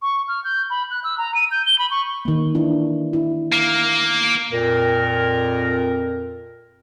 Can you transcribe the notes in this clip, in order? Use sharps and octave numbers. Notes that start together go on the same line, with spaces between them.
C#6
F6
G6
B5
F#6
E6
A#5
D#7
G6
G7
B5
C#6
D#3 A#3
E3 D4 E4
E4
A#3
F2 A#2 A#4